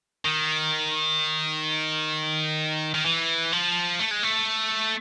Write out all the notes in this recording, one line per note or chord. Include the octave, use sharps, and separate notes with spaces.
D#3
D#3
E3
F3
A3
G#3
A3